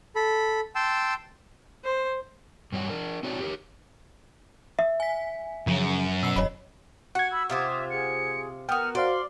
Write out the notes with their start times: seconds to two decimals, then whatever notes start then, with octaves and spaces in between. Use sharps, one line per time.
0.15 A4 B5
0.75 G5 A5 C6 E6
1.84 C5
2.72 G2 G3 C#5 F#5
2.90 D4 A#4
3.23 C4 D#4 F#4 C#5 D5
3.40 G4 A#4 C#5
4.79 E5
5.00 G#5 B6
5.67 F#2 C#3 F3
6.23 B2 E6 C7
6.36 E1 C#5 D#5 B5
7.15 F#4 F#5 G#6 C#7
7.32 B5 E6
7.50 C3 F4 C5 E5 D6 D#6 F6
7.90 G#4 C#7
8.69 B3 F#4 A#4 F#5 G5 D#6 F6
8.95 F#4 C5 D5 F5 C6